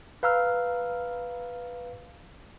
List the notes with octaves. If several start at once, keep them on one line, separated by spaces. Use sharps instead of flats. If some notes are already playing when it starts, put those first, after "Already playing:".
B4 F5 A#5 E6 F6